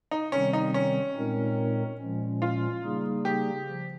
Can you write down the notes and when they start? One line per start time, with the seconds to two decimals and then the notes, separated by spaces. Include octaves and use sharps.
0.11 D#4
0.32 C3 D#3 G3 C4 C#4
0.53 D#4
0.74 C#4
1.16 A#2 G#3 C4 D#4 A#4
2.00 A#2 F3 G#3 C#4
2.42 F4
2.84 C#3 G3 A#3 D#4 G#4
3.25 G4
3.68 C#3 F3